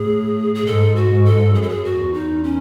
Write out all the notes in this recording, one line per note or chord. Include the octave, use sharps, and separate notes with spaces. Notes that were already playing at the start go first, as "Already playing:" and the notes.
Already playing: A2 G#4
G#4
G#2 A4
F#4
G#2
A4
F#2 G#4
A4
G#4
F#4
E2
D#4
C#4